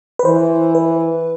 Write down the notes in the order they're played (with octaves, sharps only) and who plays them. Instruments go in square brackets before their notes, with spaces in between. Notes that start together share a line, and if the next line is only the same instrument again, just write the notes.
[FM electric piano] B4
[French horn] E3 [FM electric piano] C5
[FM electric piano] B4